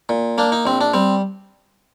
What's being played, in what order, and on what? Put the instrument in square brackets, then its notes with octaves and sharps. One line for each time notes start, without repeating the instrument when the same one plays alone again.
[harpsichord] A#2
A#3 D4
D#4
A#1 C4
D4
G3 C4